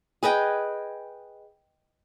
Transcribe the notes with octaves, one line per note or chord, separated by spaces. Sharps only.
G#4 B4 D#5 G5